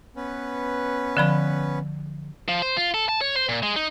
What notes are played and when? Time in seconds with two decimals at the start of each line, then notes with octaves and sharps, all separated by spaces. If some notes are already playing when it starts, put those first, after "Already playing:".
0.16 B3 C#4 B4
1.17 D3 F3 B5
2.48 F3
2.62 C5
2.77 F4
2.94 A4
3.09 A5
3.21 C#5
3.36 C5
3.49 A#2
3.63 G#3
3.76 D#4